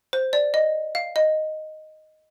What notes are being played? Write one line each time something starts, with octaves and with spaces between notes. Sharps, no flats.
C5
D5
D#5
F5
D#5